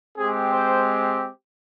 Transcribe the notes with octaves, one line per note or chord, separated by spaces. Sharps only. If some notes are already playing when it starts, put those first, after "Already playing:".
G#3 C4 G4 G#4
C5